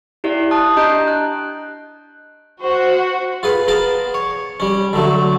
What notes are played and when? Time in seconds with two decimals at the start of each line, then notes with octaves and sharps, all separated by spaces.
0.24 E4 G4 D5 E5
0.51 A5 D#6 F#6
0.76 D4 G4 D#5 A#5 G6 D7
1.07 F#6
2.61 F#4 C5 F#5
3.43 F4 G#4 B4
3.68 B3 G#4 A#4 A5
4.14 C#5
4.60 G3 C#4
4.93 D3 F#3 A3